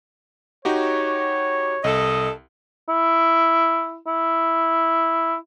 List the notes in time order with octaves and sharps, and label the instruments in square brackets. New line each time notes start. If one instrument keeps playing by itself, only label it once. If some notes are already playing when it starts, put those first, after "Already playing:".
[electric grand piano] D#4 F#4 G4 [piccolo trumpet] C#5
[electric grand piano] C2 [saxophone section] A4 D#5
[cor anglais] E4
E4